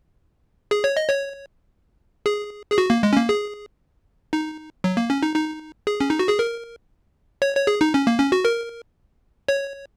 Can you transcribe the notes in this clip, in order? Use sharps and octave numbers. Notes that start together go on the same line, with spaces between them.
G#4
C#5
D#5
C#5
G#4
G#4
F#4
A#3
G#3
C#4
A#3
G#4
D#4
F#3
A#3
C#4
D#4
D#4
G#4
C#4
D#4
F#4
G#4
A#4
C#5
C#5
G#4
D#4
C#4
A#3
C#4
F#4
A#4
C#5